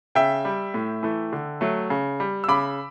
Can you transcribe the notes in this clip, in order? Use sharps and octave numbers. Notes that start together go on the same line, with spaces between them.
C#3 E5 G5
G3
A2
E3 A3
D3
F#3 A3
C#3
G3
E6
C#3 B5 D6